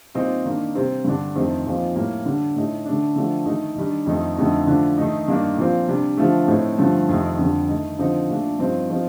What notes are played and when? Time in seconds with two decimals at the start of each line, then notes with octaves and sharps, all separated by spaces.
0.15 A#2 G3 C4 D#4
0.45 D#3 A#3 D4
0.75 C3 G3 C4
1.04 G2 D3 G3 D4
1.35 F2 D#3 A3 C4
1.66 A#2 F3 C4 D#4
1.95 A2 G3 A#3
2.26 D3 G3 D4
2.55 A2 A3 D#4
2.85 D3 A3 D4
3.16 D3 F3 A3 D4
3.46 D#3 A3 D#4
3.76 D#3 G3 D4
4.06 F2 D#3 A3 D#4
4.37 F2 D3 A3 D#4
4.67 D3 F3 A3 D4
4.98 D#3 A3 D#4
5.28 G2 D#3 A#3 D4
5.57 A#2 F3 C4
5.88 C3 G3 D4
6.17 D3 F3 A3
6.48 A2 A3 C4 D#4
6.78 G2 D3 F3 A3
7.09 F2 C3 D#3 A3
7.38 F2 D3 G3 D4
7.69 D#3 A3 D#4
7.99 D3 F3 C4 D#4
8.29 A#2 A3 D4
8.59 G2 F3 C4 D#4
8.90 F3 C4 D#4